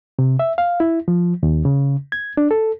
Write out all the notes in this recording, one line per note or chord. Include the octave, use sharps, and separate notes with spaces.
C3
E5
F5
E4
F3
D#2
C#3
G#6
D4
A4